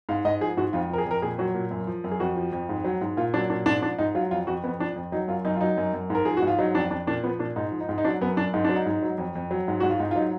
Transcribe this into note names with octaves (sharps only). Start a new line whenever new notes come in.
G#2 F5
G#2 D#5
F3 G#4
G#2 F#4
F2 F4
F3 A#4
G#4
F2 A#4
A#2 G#4
F#3 F#4
A#2
F#2
F3
F#2
G#4
F2 F#4
F3
F2
G#2
F#3
G#2
A#2 F4
F#3 D4
A#2 D4
G#2 D4
F3 D4
G#2 D#4
F#3 F4
F2 F4
F2 F#4
F2 B3
F3 D4
F2
F#3 D#4
F#2 F4
F#2 D#4
F4
F#3 D#4
F#2
F#2
G#2 A#4
F3 G#4
F#4
G#2
F4
F#3 D#4
F2 D4
F2 D4
A#2 D4
F3 B3
A#2 D4
G#2 D#4
F3
D#4
G#2
D#4
F#3 D4
F#2 B3
F#2 D4
G#2 D#4
F#3 D4
D#4
G#2
F#3
F2
F2
F#3
G#2
G#2 F#4
F4
G#2 D#4
F4
F#3 D#4